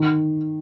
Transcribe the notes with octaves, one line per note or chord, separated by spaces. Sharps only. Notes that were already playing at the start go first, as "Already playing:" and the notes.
Already playing: D#3